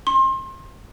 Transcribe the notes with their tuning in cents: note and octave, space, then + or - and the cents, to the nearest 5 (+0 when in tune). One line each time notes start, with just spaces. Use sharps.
C6 +30